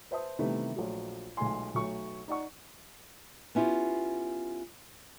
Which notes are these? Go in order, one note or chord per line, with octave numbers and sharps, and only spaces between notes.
B4 C5 E5 A5 D#6
C3 D#3 E3 G3 A3 B3
A#1 F#3 A3 F#4
B1 G#3 A3 F4 G#5 C6
B1 F#3 A3 C#6
D#4 D5 F#5 C#6
B3 C#4 E4 F4 G4